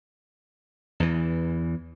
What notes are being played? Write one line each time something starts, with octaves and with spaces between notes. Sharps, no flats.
E2 E3